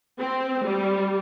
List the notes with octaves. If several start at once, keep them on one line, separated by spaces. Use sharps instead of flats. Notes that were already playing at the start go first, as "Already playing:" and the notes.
C4
G3